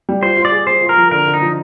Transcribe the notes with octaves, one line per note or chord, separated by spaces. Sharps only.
G3
F4 C5
F4
D5
G#4
G#4 C5
F4
A#4
F3
D3 A#4
D3
D#4
F3